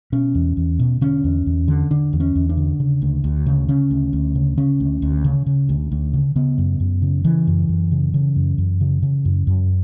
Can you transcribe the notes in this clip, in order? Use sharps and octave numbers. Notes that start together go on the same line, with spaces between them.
B2 C#4
E2
E2
B2
D3 C#4
E2
E2
D3
D3 D4
E2
C#4
E2
D4
D3
C#3
D2
D2
C#3
C#3 C#4
D2
D2
C#3
C#3 C#4
D2
D2
C#3
C#3
D2
D2
C#3
C#3 B3
F#2
F#2
C#3
C#3 E3
F#2
F#2
C#3
C#3
F#2
F#2
C#3
C#3
F#2
F#2